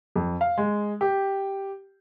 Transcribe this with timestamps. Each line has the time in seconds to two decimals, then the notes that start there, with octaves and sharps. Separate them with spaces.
0.16 F2
0.41 F5
0.58 G#3
1.01 G4